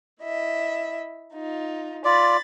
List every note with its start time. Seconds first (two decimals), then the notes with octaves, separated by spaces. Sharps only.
0.22 E4 D#5 E5
1.33 D#4 F4
2.05 F4 D5 B5 A6